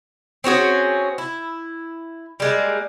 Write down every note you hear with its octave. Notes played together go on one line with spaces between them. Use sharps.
C4 C#4 F#4 G#4
E4
G3 G#3 A#3